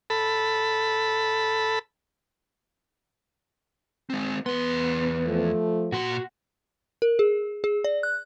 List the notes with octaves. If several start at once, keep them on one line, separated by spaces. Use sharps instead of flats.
A4 B5
G#3 C4
E2 B3 C6
F3 A3
A#2 F#4 C6
A#4
G#4
G#4
D5
F#6